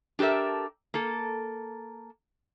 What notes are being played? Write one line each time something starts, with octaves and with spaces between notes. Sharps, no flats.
D4 G4 A4 A#4 E5
A#3 A4